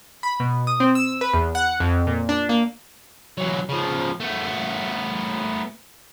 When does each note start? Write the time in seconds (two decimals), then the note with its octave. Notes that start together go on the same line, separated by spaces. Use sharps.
0.23 B5
0.40 B2
0.67 D#6
0.80 C4
0.95 E6
1.21 B4
1.34 E2
1.55 F#5
1.80 F2
2.07 A#2
2.29 D4
2.49 A#3
3.38 E3 F#3
3.69 C#3 F3
4.20 A3 B3